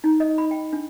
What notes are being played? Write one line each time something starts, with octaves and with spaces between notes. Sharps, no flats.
D#4
D#5
B5
G5
D4